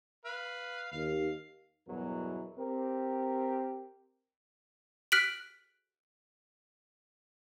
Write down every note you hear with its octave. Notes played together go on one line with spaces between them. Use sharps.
B4 F5
D#2 F5
E2 G2 B2 E3 F#3 A#4
C4 G4 A#4
F6 F#6 B6 D7 F#7